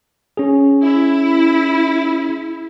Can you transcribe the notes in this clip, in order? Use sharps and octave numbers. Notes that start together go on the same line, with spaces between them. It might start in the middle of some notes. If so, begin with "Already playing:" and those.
C#4 G#4
E4